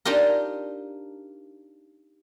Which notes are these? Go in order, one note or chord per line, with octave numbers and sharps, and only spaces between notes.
D4 D#4 F4 G4 A#4